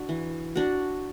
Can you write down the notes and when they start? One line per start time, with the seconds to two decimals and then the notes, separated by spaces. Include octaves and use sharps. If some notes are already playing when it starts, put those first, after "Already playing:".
Already playing: D4 F#4
0.09 E3
0.56 D4 F#4